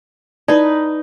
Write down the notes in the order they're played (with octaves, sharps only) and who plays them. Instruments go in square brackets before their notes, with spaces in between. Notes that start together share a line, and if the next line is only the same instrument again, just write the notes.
[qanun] D#4 B4 [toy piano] E4 D5 A5